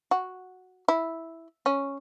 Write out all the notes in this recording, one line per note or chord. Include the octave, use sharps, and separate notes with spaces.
F#4
E4
C#4